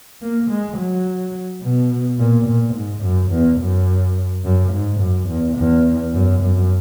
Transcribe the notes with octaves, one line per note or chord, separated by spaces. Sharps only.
A#3
G#3
F#3
B2
A#2
A#2
G#2
F#2
E2
F#2
F#2
G#2
F#2
E2
E2
F#2
F#2